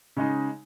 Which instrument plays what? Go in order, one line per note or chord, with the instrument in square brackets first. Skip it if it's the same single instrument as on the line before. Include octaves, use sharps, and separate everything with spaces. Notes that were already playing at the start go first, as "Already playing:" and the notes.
[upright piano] C#3 G#3 D#4